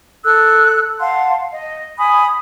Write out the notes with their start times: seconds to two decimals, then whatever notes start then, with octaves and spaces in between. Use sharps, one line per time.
0.24 A4 E6 F#6
0.99 F5 F#5 A5 C6
1.50 D#5
1.98 G#5 B5 D#6